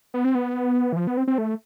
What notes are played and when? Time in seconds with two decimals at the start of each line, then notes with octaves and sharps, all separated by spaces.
0.14 B3
0.25 C4
0.35 B3
0.92 E3
0.97 F3
1.07 B3
1.17 C4
1.27 C4
1.38 A3